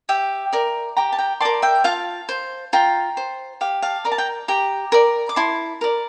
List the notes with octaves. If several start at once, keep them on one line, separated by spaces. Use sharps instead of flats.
G4 E5 G5
A#4 D5
G4 G5 A#5
A5
G5 A#5
A#4 D5 A5 C6
E5 G5
F4 F5 A5
C5
F4 G5 A#5
C5
G4 F5
F5 A5
A#4 D5 A#5
A5
G5 A#5
G4 G5 A#5
A#4 D5
D6
E4 A5 C6
A#4 D5